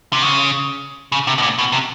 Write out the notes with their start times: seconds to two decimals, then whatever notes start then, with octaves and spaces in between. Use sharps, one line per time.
0.13 C3
0.22 C#3
1.12 C#3
1.27 C3
1.38 B2
1.42 A#2
1.58 B2
1.72 C3